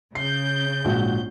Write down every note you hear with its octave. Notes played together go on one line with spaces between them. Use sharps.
C#3 G6 C7
A#1 G#2 F#4